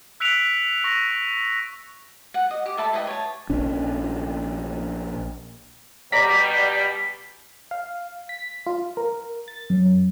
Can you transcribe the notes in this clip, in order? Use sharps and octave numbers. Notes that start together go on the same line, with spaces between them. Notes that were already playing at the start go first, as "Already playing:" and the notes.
E6 F#6 B6 C#7 D7 F7
C#6 A#6
F#5
D#5
G4
A4 E5 A5 B5
E4 B4 D#5 G5
C#5 A5
A#1 C#4 D4
B2 G3 D5 A#5 B6
F5
B6
F4
A#4
A6
F#2